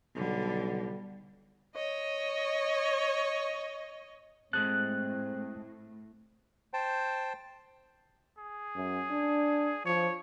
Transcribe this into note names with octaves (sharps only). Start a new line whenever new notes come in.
B1 D3 G3
C#5 D#5
A2 G#3 C4 G#4 A4 F#6
C5 G5 A5
G#4
F#2
D4
F3 C#5